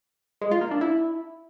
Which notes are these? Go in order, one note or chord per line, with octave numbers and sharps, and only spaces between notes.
G#3
F4
A#3
D4
E4